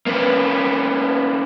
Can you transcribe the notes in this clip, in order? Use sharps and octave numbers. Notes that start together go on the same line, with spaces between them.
A#3 C#4 B4